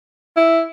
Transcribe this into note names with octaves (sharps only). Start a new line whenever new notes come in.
E4